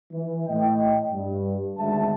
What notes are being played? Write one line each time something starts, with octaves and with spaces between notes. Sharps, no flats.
E3
A2 D#5 G5
G2
G#1 D2 G#3 E5 A5